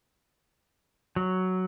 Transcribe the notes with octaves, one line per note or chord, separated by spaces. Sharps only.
F#3